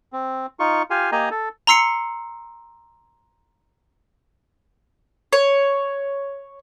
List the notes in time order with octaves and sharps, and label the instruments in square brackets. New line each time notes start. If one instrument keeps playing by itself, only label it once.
[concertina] C4
D#4 F4 C#6
F4 G4 F5 G#5
A#3 G4 D#5 G#5 A#5
A4
[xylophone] A#5 C6 E6 C7 C#7
[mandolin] C#5